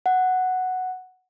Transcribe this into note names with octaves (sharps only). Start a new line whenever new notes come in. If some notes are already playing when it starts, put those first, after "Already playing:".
F#5